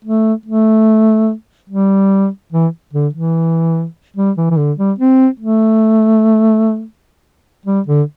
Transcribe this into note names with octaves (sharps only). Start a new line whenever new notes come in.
A3
A3
G3
E3
D3
E3
G3
E3
E3
D3
G3
C4
A3
G3
D3